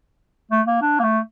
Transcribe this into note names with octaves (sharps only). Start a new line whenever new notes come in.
A3
A#3
D4
A#3
A3